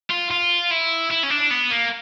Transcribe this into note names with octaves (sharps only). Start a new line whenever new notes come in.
F4
F4
E4
E4
C#4
D4
B3
A#3